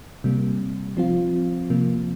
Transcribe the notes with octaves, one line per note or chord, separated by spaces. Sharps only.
C3 G3 A#3
F3 C4 F4
C3 F3 A#3